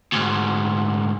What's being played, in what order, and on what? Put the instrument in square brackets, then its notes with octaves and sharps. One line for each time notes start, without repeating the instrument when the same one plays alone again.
[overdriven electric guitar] D2 G#2